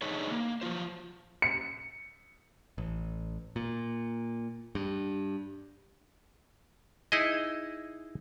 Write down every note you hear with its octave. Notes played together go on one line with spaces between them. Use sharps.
D4 D#4 G#4 B4 C#5
A#3
F3 F#3 F4 C5
C#7
A1
A#2
G2
D#4 E4 G#4 D#5